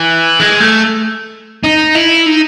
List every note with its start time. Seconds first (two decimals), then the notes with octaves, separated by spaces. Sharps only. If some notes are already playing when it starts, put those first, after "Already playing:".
Already playing: E3
0.40 G#3
0.60 A3
1.63 D#4
1.95 E4
2.26 D#4